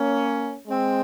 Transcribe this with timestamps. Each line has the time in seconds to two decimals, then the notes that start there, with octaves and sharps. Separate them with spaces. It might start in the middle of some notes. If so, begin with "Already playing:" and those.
Already playing: A#3 C#4
0.67 G#3 C4